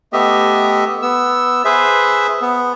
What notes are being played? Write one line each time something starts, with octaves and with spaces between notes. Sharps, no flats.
A3 B3 G4 D#5 E5
B3 E6
G#4 B4 C5 E5
B3